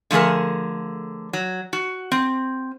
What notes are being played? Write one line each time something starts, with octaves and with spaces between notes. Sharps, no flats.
D3 F3 A3 G#4 A#4
F#3
F#4
C4